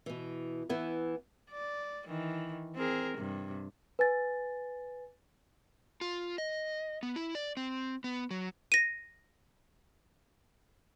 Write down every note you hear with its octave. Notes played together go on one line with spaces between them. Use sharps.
B2 E3
E3 B3 E4
D5
D#3 E3
C4 G#4 A#4
G2 C3
B4 G#5 A6
F4
D#5
B3
E4
D5
C4
B3
F#3
A#6 D#7